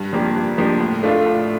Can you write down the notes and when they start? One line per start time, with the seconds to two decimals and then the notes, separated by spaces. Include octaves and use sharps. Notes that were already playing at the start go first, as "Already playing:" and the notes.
Already playing: G2
0.13 F3 A#3 D4 G4
0.36 G2
0.58 F3 A#3 D4 G4
0.80 A2
1.03 A3 D4 F4 A4
1.26 A2